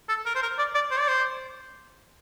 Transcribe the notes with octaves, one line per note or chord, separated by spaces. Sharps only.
A4
A#4
C5
A#4
D5
D5
C5
D5
C5